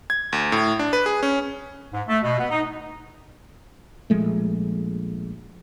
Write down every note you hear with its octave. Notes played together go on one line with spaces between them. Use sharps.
G#6
D2
A2
D4
B4
G#4
C#4
G#2
A3
B2
B3
D#4
A#1 F3 G#3 A3